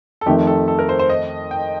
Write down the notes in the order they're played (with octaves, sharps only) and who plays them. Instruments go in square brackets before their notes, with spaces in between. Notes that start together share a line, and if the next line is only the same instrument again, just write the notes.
[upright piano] A4
[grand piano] F2 D#3 A3 [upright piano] G4
[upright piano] A4
A4
A#4
C5
C5
D#5
G5